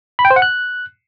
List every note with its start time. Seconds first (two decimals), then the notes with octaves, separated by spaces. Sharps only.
0.19 B5
0.25 G5
0.31 C5
0.36 F#5
0.42 F#6